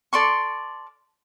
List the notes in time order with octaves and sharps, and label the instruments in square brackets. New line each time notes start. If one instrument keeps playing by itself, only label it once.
[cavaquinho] A4 D5 C6 C#6